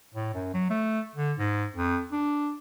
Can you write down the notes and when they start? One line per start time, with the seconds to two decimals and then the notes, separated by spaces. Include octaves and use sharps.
0.14 A2
0.34 F#2
0.54 F#3
0.70 A3
1.15 D3
1.39 G#2
1.75 F2
2.12 D4